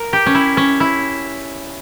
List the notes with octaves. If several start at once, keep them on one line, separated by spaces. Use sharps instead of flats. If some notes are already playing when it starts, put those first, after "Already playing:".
Already playing: A#4
G4
C#4
E4
C#4
E4